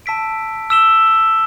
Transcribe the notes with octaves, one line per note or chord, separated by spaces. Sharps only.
A5 E6 B6 D7
E6 B6 E7 G7